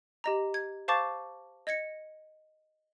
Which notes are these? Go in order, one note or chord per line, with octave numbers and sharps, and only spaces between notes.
G4 D#5 A#5
G#6
C5 F5 A5 C#6 D6 A6
D#5 G#6 A#6 C#7